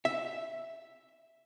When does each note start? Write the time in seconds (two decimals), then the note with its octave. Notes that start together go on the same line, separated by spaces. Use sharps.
0.05 E5